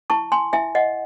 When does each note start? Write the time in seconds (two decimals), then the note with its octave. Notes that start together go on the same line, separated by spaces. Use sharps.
0.10 E4 A5 C#6
0.32 G#5 C6
0.53 E4 E5 G#5
0.75 D#5 F#5